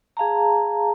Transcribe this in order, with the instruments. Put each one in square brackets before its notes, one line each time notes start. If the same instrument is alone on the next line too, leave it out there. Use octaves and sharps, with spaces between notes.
[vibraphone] G#4 F5 A5 A#5